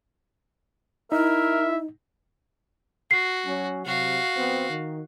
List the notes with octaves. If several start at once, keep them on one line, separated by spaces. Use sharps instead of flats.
D#4 E4 A#4 E5
F#4 C7
F#3 C#4
C3 F#3 F#4 F5
F2 B3 C4
D#3